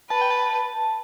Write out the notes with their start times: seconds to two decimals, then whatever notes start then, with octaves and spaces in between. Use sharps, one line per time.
0.10 B4 A5
0.21 G5
0.31 A5